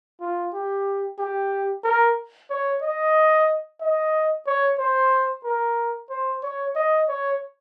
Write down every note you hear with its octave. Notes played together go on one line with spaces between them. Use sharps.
F4
G4
G4
A#4
C#5
D#5
D#5
C#5
C5
A#4
C5
C#5
D#5
C#5